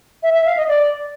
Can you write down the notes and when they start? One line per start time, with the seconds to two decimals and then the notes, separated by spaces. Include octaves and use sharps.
0.23 E5
0.34 E5
0.46 F5
0.57 D#5
0.68 D5